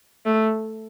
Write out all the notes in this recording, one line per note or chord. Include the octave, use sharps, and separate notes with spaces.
A3